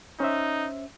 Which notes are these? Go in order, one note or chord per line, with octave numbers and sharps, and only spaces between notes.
C#4 D#4 C5 E5